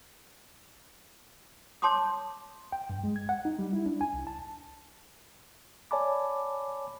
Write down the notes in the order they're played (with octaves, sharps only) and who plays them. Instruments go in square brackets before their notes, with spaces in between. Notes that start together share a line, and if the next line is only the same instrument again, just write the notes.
[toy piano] C#5 A5 C6 D6 D#6
[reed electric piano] G5
G2
G#3
G#6
F#5
D#4
G3
E4
D4
G#5
C2
A5
[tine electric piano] C#5 D5 G#5 A5 B5 D6